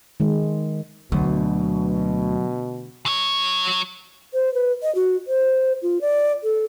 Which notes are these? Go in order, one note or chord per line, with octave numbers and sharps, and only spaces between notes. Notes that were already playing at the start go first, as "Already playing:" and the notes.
D#3 G#3
D2 B2 F#3
F#3 C#5
C5
B4
D#5
F#4
C5
F4
D5
A4